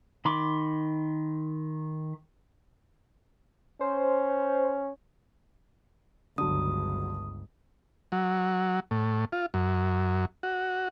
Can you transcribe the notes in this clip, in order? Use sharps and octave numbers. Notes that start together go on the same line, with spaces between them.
D#3 B5 C6 D6
C#4 C5
G1 C#2 D3 F#3 D#6
F#3
A2
F4
F#2
F#4